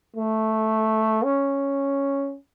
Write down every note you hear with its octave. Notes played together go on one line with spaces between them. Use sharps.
A3
C#4